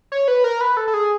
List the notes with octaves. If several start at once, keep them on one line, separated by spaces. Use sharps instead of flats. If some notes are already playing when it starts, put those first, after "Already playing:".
C#5
B4
A#4
B4
A4
A4
G#4